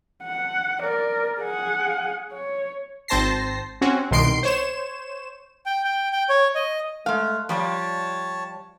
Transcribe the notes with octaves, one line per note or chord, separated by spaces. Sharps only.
F#5
A#4 D5
G#4 F#5
C#5
G#1 C4 C5 A5 A#6 C7
C4 C#4 F#4
C2 B2 D#3 C6 C7 D7
C5 C#5 E7
G5
G5
G5
C#5
D#5
G#3 A3 F5
F3 G3 C#5 D5 A5